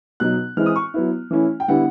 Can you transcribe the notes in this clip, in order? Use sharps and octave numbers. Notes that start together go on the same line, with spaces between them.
B2 F#3 B3 D#4 F#6
E3 G#3 C4 E4 F6
D#6
C#6
F#3 B3 E4
E3 A3 C#4 E4
G5
D3 G3 B3 E4 F#5